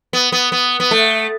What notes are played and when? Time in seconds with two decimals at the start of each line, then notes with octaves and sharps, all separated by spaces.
0.13 B3
0.32 B3
0.52 B3
0.80 B3
0.91 A3